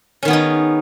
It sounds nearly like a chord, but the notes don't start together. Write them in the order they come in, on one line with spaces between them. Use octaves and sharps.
C#4 D#3 B3 G#4 D#4